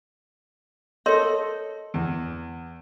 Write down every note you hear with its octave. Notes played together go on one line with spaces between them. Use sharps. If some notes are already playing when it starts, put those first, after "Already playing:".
A4 A#4 C#5 D#5 C6
E2